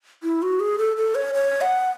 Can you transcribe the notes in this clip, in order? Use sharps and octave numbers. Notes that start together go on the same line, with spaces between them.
E4
F#4
G#4
A4
A4
C#5
C#5
F#5